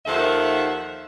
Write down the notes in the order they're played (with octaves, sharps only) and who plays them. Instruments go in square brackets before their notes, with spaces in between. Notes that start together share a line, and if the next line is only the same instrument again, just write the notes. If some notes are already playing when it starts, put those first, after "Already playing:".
[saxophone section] D#2 D#3 F3 A4 E5 F#5